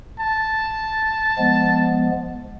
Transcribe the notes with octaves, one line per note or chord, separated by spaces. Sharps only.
A5
F3 G#3 B3